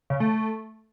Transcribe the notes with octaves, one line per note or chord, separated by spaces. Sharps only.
C#3
A3
A3